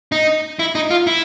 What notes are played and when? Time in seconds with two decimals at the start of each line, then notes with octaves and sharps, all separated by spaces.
0.12 D#4
0.59 E4
0.75 D#4
0.90 F4
1.07 E4